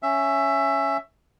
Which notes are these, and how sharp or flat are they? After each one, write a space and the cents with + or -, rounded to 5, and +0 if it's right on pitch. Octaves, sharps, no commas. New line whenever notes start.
C#4 +0 E5 +15